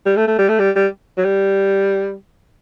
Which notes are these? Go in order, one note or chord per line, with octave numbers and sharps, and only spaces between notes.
G3
A3
A3
G3
A3
G3
G3
F#3
G3